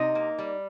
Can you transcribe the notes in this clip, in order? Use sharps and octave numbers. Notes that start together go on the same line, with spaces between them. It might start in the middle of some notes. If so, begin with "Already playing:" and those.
Already playing: C3 D#4 D#5
A#3
G3